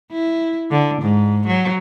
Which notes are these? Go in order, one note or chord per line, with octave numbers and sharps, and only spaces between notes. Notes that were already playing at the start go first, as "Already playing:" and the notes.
E4
D3
G#2
F#3